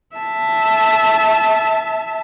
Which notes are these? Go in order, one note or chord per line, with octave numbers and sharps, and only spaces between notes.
E5 A5